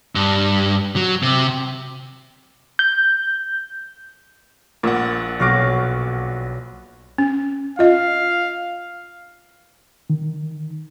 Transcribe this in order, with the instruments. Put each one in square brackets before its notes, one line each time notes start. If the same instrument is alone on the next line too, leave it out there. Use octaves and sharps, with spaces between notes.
[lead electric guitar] G2
F#3
C3
[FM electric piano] G6
[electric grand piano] A#1 F#5 [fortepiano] A#2 [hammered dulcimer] D5 [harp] C#6 E6
[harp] B1 C#6 [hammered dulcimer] F#4 F5 D6
[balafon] C#4
[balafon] F4 D#5 [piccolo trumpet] F5
[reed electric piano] D#3